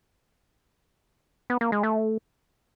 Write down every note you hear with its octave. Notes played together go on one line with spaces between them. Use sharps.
B3
A#3
G#3
A3